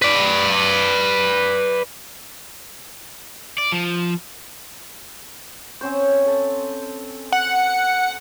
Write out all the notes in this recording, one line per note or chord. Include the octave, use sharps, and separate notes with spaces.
B4 D5
D5
F3
C4 C#4 C5
A4
F#5